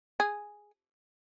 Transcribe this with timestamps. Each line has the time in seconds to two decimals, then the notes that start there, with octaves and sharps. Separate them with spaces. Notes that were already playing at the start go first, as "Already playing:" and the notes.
0.20 G#4